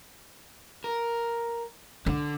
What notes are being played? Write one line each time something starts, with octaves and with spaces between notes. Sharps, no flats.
A#4
D3 D4